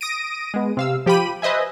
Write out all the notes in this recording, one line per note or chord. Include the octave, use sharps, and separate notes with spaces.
D#6 A#6 D7 D#7
G#3 B3
C3 F5 E6
F3 G4 G5 B5 D#7
B4 C5 D#5 E5 G#5